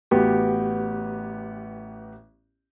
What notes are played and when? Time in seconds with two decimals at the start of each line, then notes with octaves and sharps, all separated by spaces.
0.11 A1 B3 F#4 G4